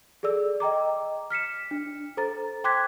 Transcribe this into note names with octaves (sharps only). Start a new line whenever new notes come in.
G#4 A4 D5 E6
D#5 G5 A#5 D6
F6 B6 C#7 E7
D4
A4 C5 A#5 A6
G5 C6 D6 F#6 G#6 B6